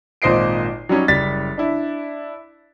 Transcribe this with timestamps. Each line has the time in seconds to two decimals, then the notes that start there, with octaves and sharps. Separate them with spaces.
0.22 G#1 A#2 C5 D#5 C7 D7
0.89 F#3 G3 C#4 D#4
1.08 F#1 G3 A6 B6
1.58 D4 E4